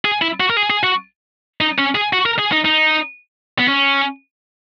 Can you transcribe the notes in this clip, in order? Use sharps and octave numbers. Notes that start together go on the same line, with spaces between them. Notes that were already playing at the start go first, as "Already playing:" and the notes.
G#4
E4
F#4
A#4
G#4
G#4
F#4
D#4
C#4
G#4
F#4
A#4
G#4
D#4
D#4
B3
C#4